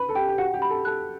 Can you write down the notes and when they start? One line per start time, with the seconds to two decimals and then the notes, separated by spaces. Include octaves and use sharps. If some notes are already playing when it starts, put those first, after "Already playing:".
Already playing: B4 B5
0.09 A4
0.15 G4 G5
0.28 G4
0.38 F#4 F#5
0.54 G4
0.62 B5
0.70 A4
0.85 A4 F#6